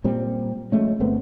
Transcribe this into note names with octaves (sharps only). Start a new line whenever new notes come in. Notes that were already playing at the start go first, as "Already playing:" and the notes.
A#2 G3 C4
F3 G#3 A3 C#4
G1 A3 B3 C4